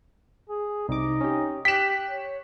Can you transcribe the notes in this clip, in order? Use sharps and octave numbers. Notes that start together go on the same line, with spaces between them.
G#4
C2 D#4 D6
C#4 G4
G4 G5 F#6 B6 E7
C#5